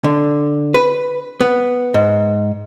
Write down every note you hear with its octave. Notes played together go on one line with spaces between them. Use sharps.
D3
B4
B3
G#2